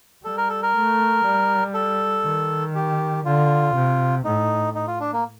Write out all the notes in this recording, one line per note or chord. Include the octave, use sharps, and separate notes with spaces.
G3 A4
A#4
A4
A#4
A3
G3
A4
D#3
G4
D3 F4
C3
A2 D#4
D#4
F4
D4
A#3